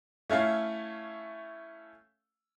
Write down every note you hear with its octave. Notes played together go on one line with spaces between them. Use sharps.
A3 C#4 E4 F5